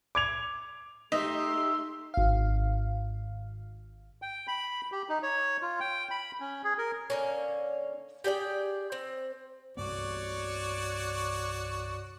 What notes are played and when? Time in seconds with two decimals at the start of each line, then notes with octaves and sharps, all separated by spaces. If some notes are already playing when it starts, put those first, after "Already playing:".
0.15 D6 G#6 F7
1.12 A3 D#4 G4 D#5 E5 C6
2.14 G#1 F5
4.22 G5
4.47 B5
4.92 G4
5.09 D#4
5.23 C#5
5.62 F4
5.80 G5
6.11 B5
6.40 C#4
6.64 G#4
6.78 A#4
7.10 D3 A#3 C#4
8.24 G4 G#4 D5 G5
8.92 C4
9.77 C2 G2 B3 F#4 C#5 D5